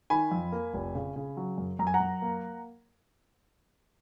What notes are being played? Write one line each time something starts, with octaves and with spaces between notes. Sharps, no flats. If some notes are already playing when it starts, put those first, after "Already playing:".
D#3 G#5 B5
F2
A#3
F1
C#3
C#3
F#3
F#2
F#2 A#5
G#5
F#5 A#5
F#2
A#3